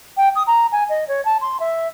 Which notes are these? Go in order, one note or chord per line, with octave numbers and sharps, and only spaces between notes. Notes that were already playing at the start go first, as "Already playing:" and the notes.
G5
D#6
A#5
G#5
D#5
C#5
A5
C6
E5